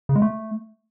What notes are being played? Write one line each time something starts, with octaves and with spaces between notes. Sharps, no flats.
C#3
G#3
A3